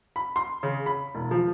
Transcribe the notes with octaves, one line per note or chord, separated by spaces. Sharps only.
B5
C6
C#3
B5
E1
F3